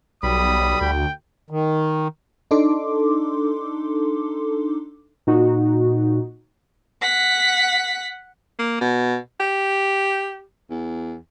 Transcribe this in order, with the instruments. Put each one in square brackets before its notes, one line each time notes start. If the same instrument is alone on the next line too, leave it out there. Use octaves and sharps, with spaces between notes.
[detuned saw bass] B1 [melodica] G3 B5 [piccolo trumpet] D#6
[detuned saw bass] D2 [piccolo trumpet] G5
[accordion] D#3
[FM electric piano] D4 D#4 A4 C6 D6
[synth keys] A#2 D#4 F#4
[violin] F#5 B6
[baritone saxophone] A#3
B2
G4
E2